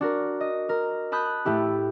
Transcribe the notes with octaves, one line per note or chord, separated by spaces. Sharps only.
D4 F#4 A#4
D#5
A#4
A5 B5 D#6 F#6 G6
A2 A3 E4 G4